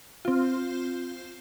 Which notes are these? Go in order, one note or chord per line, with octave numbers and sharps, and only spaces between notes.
C4 F4